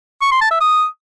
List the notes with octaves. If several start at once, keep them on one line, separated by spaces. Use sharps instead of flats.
C#6
C6
A5
E5
D#6